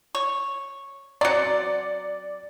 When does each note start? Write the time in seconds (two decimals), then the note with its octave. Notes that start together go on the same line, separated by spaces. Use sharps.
0.15 C#5
1.21 F#3 C4 D5 C#7